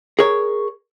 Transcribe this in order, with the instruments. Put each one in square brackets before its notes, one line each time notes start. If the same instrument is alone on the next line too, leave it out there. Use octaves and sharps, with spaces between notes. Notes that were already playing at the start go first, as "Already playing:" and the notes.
[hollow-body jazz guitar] G#4 A#4 C#5